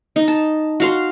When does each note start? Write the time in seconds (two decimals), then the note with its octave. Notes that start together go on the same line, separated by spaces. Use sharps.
0.16 D#4
0.28 A5
0.80 F#4 F5 C6